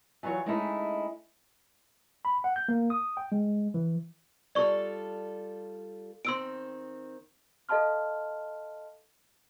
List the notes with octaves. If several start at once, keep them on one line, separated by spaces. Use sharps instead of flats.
E3 F#3 F4 C#5
G#3 A3 C#4 D#4 E4
B5
F#5
G6
A#3
D#6
G5
G#3
E3
G3 F4 A4 D5 C#6
D#3 C4 C6 E6 D7
A4 D#5 F5 A5 C6 F6